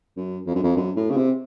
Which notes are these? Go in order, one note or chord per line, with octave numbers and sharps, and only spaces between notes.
F#2
F2
F#2
F2
F#2
A2
C#3
C3